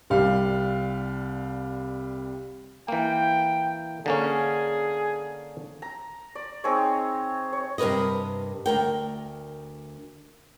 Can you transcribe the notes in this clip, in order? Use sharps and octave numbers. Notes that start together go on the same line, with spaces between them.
C2 G3 F5
E3 A#3 G5
D3 A#3 C#4 G#4
A#5
D5
C4 D#4 G#4 C#5
C#5
G2 C3 A#4 B4 D#5
D2 A#4 G5